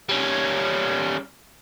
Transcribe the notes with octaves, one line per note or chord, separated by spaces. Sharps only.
G3 C#4